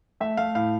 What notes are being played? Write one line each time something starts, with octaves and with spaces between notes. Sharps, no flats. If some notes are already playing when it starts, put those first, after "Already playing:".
A3 E5
A3 F5
A2 F5